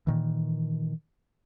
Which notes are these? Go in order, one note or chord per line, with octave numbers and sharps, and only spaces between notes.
A#2 D#3 E3